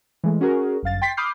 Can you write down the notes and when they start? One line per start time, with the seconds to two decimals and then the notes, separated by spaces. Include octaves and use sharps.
0.24 E3 G#3 A3
0.41 C#4 F#4 G#4 A#4
0.83 G1 F#2 F5 A6
1.02 G5 C6 A6 B6 C7
1.17 B5 D6 D#6 F6 G6 C7